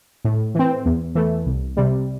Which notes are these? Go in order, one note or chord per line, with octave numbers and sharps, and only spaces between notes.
A2
E3 C4
E2
E3 A3
C2
C3 G3